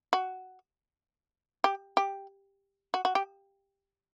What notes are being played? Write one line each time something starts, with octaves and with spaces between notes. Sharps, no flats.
F#4
G4
G4
F#4
F#4
G4